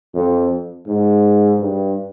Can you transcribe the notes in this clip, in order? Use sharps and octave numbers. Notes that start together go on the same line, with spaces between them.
F2
G#2
G2